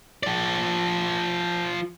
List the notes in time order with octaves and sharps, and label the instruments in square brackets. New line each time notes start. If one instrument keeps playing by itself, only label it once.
[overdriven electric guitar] F3 D5